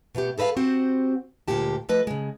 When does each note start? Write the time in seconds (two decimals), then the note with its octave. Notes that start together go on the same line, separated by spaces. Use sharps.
0.15 B2 A3 B3 G4
0.38 G#4 A4 B4 D#5 F5
0.57 C4 F#4 G4 C5 F#5
1.48 D2 G2 A#2 G#3 G4 A5
1.89 F3 A3 B4 D#5
2.07 C#3 G#3